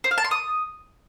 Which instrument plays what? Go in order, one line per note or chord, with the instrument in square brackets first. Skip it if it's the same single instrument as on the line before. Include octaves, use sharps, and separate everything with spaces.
[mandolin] C5
F5
A5
C6
D#6